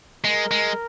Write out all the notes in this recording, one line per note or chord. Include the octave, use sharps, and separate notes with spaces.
G#3 A#4
G#3